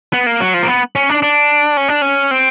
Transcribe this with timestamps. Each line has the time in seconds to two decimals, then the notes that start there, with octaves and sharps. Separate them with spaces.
0.13 B3
0.26 A#3
0.40 F#3
0.54 F3
0.63 A#3
0.67 B3
0.95 C#4
1.09 D4
1.22 D4
1.77 C#4
1.88 D4
2.02 C#4
2.31 C4